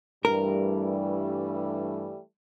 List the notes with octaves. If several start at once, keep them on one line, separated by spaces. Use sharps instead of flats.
G2 E3 G3 A3 A#4